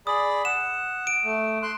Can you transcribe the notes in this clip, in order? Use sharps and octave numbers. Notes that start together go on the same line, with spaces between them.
G#4 D5 B5 D#6
F#5 E7
D7
A3
C6 F#6